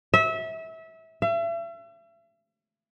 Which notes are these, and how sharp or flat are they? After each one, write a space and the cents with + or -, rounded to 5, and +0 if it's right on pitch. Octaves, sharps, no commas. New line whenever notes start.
E5 -25
E5 +40